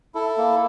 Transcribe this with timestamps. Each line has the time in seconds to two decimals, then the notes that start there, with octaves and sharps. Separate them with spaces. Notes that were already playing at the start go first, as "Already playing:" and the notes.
0.15 E4 A4
0.37 A#3